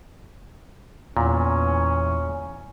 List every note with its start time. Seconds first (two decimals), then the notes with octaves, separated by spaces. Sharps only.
1.17 E2 A#2 C#4